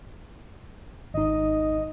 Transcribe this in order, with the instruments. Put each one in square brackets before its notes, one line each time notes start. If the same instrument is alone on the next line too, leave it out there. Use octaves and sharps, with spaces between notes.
[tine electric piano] G#1 D#4 [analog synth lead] D#5